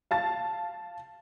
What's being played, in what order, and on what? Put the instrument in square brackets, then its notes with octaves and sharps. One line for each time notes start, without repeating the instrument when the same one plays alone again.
[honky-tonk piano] F5 A5 A6